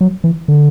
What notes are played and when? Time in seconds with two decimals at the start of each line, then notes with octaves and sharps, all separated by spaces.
0.01 F#3
0.24 E3
0.48 D3